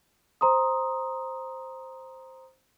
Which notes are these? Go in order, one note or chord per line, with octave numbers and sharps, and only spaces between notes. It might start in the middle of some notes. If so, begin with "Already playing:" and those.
C5 A#5 C6 D#6